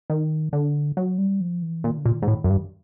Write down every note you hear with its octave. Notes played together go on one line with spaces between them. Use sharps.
D#3
D3
F#3
G3
F3
E3
A#2 D#3
D3
A#2
D#3
G#2
A2
F#2
G2